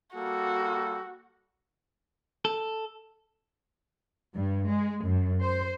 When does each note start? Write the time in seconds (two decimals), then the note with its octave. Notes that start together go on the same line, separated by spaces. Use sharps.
0.15 G3 A#3 F#4 A4
2.45 A4
4.35 G2
4.68 G#3
5.05 F#2
5.42 C5